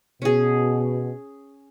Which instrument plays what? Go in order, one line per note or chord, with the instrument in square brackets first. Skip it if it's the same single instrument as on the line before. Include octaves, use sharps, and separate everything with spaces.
[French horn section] B2 [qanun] C#4 G#4